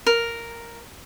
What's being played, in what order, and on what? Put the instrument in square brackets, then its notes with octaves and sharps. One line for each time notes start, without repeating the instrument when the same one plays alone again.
[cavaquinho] A#4